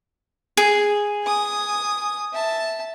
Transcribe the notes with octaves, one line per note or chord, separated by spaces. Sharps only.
G#4
G#5 D#6
E5 A5